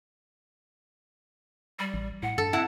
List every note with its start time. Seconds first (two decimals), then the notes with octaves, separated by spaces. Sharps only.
1.79 G3
1.94 A1
2.23 A2 F#5
2.38 G2 A4
2.53 C4 E4 F#5